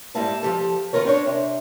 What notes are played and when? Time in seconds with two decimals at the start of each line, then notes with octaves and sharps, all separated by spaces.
0.15 G#2 G3 A#3 E4 F5 A5
0.43 F3 G4 A4
0.93 D#3 B3 F4 A#4 C#5
1.05 C4 D4 C#5
1.26 C3